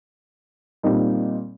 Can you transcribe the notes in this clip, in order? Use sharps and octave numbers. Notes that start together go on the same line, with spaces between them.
A#2 G3 C4 D#4